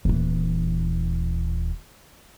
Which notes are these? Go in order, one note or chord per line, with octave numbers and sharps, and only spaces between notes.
D#1 E3